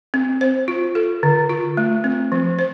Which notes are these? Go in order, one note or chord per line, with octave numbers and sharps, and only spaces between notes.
C4
C5
F4
A4
D3
F4
A3
C4
F3
C5